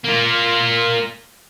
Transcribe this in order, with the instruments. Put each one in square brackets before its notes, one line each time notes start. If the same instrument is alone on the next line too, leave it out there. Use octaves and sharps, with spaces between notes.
[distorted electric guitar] A#3 F4